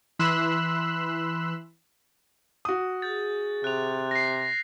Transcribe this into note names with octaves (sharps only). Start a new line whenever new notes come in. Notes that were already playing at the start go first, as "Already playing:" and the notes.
E3 B5 C6 E6 F#6
F#4 D#6
G#4 G6 A6
C3 F#6 F7
A#6 C7